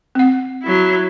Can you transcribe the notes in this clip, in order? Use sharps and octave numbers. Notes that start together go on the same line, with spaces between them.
C4 F#5
F#3 E4